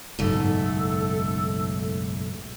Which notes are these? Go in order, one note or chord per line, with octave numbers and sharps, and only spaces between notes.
F#1 B1 G#2 A3 A4